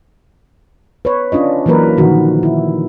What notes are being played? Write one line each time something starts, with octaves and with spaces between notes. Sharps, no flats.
B4 C#5
C#4 D4 F4 D#5
E3 F#3 A#3 A#4 B4
A#2 D3 D#3 F3 F#4
E4